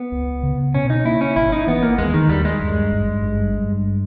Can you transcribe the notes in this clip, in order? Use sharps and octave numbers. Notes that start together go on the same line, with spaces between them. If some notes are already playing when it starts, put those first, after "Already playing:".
Already playing: B3
C#2
C#3
B2 C#4
D#4
A#3 E4
C#4
G#1 E4
D#4
E3 B3
A#3
D#2 G#3
D#3
D#2 G3
G#3
G2
G#1
G2
G2